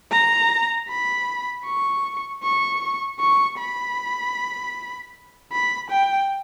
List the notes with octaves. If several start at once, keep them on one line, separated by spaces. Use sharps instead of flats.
A#5
B5
C#6
C#6
C#6
B5
B5
G5